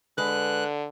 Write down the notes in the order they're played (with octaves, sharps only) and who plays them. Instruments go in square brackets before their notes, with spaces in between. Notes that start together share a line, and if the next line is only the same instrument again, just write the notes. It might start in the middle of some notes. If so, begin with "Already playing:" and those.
[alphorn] D3 [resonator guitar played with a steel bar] G#3 B4 [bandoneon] F#6